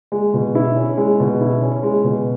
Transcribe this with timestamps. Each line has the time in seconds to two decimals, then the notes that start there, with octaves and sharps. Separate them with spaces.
0.12 G#3
0.34 B2
0.55 E4
0.76 C#4
0.97 G#3
1.20 B2
1.41 E4
1.62 C#4
1.83 G#3
2.04 B2